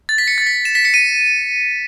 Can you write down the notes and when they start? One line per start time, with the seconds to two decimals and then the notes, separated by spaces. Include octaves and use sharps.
0.09 A6
0.18 B6
0.28 C#7
0.38 A6
0.46 B6
0.65 E7
0.75 B6
0.85 C#7
0.94 D#7